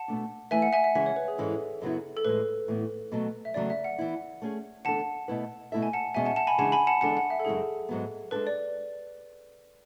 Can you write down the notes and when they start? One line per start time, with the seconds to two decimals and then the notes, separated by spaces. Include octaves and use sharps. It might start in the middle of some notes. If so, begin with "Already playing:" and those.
Already playing: F#5 A5
0.08 B2 A3 D4
0.51 E3 A3 E4 B4 E5 G#5
0.62 F#5
0.73 E5 G#5
0.84 E5
0.95 C#3 E3 G#3 C#4 G#4 E5
1.06 C#5
1.16 B4
1.28 G#4
1.38 G#2 E3 G#3 C#4 A4
1.81 F#2 C#3 F#3 B3 E4
2.17 A4
2.25 A2 E3 G#3 B4
2.68 A2 E3 B3
3.12 B2 F#3 A3
3.45 E5
3.54 E2 C#3 F#3 A3 D5
3.70 E5
3.84 F#5
3.98 E3 B3 E4
4.42 A3 C#4 G#4
4.85 E2 D3 A3 D4 A4 F#5 A5
5.28 B2 A3 E4 B4
5.72 B2 A3 E4 A4 E5
5.83 G#5
5.93 F#5 A5
6.14 E2 B2 G#3 C#4 E5 G#5
6.26 F#5 A5
6.36 F#5 A5
6.47 G#5 B5
6.58 C#3 E3 G#3 D4 G#4 F#5 A5
6.72 G#5 B5
6.87 F#5 A5
7.01 E2 D3 G#3 D4 A4 F#5 A5
7.17 F#5
7.30 E5
7.39 A4
7.45 F#2 C#3 G#3 C#4 E4 G#4
7.89 G#2 F#3 B3
8.31 G#3 D4 A4 B4
8.47 D5